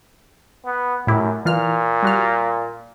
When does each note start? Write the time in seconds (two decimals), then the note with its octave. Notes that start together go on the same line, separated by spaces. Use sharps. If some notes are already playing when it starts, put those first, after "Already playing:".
0.65 B3
1.07 F#2 A2 E4 G4
1.45 A#2 E3 F4 F6
2.03 G3 F#4 F6